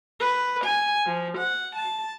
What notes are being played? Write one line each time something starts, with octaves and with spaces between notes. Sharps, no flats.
B4
G#5
F3
F#5
A5